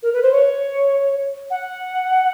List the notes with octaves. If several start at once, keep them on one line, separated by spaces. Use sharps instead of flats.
A#4
B4
C5
C#5
F#5